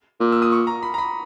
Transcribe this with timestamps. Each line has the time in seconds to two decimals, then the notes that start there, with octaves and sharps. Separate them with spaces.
0.20 A#2
0.32 E6
0.42 D#6
0.52 C#6
0.67 A#5
0.83 B5
0.94 A#5
0.98 B5